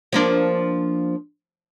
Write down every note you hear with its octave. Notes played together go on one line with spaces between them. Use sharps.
F3 A#3 D4